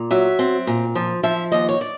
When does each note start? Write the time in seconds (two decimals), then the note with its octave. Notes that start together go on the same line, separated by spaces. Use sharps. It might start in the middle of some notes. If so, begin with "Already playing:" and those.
Already playing: A#2
0.11 F#3 E5
0.39 C4
0.67 A#2
0.95 F3
1.23 F3 E5
1.52 D#2 D#5
1.69 C#5
1.81 D5